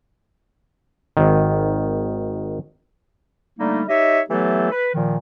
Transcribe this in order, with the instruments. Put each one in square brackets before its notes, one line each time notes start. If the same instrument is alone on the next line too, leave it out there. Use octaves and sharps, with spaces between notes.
[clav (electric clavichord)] G#1 D#3
[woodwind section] D3 G3 A3 A#3 D#4
D#4 G4 C#5 D#5 E5
E3 F#3 A3 B3 G4 A4
B4
A#2 D#3 F3